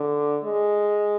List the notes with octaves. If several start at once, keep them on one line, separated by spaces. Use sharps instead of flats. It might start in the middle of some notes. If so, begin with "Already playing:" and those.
Already playing: D3
G#3